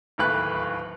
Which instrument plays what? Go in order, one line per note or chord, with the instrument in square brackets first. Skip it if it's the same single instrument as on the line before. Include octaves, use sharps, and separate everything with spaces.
[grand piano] D1 D#2 A3 B4 F#6